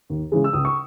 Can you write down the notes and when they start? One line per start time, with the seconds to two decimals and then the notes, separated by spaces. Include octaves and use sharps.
0.10 D#2
0.32 C#3 E3 G#3
0.44 E6
0.53 C#2 D#6
0.65 C#6